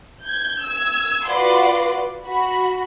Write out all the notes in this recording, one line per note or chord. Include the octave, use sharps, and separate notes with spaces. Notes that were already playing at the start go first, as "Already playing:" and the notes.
G6 G#6
E6 G#6
F4 F#4 B4 D5 F#5 C6
F#4 B5